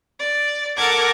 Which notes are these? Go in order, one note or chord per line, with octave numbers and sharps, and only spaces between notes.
D5
A4 A#4 F#5 A5 D6 G#6